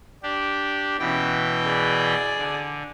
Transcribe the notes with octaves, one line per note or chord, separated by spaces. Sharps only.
D4 G4
B2 E3 C#4 G5
G#4 D5
D3